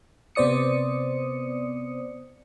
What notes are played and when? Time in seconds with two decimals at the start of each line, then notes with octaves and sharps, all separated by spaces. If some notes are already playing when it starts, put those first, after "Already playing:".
0.35 C3 B3 C5 D5 D#6 C#7